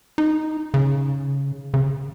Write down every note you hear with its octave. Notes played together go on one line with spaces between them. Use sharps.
D#4
C#3
C#3